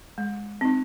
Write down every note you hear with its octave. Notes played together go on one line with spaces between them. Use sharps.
G#3
C4 D#4